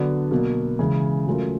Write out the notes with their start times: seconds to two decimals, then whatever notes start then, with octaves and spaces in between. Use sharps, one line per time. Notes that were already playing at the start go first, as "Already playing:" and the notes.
Already playing: D3 F#3 B3 D4 F#4
0.31 B2 F#3 A#3
0.79 C#3 E3 G#3 C#4
1.27 F#3 A3 C#4 F4 A#4